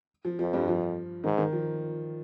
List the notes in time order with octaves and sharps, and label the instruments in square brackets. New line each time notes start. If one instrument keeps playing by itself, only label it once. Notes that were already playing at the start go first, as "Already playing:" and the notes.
[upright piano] F3
[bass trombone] F2 [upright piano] F3
[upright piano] G2 G3
F3
[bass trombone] G#2 [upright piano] D#3
[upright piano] D#3
F3